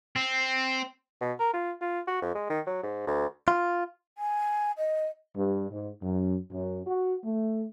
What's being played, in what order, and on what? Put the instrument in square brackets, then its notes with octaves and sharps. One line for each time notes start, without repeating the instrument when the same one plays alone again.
[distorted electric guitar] C4
[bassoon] B2
A#4
F4
F4
F#4
F2
G#3
D#3
F#3
G#2
D2
[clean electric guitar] F4
[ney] G#5
D#5
[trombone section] G2
G#2
F#2
F#2
F#4
A3